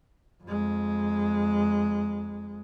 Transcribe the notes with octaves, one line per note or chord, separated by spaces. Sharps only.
F2 G#3